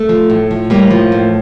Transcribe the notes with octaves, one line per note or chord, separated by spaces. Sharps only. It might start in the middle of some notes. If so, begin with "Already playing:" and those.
Already playing: A3
F3
A2
F3
A2 G3 A#3
F3
A2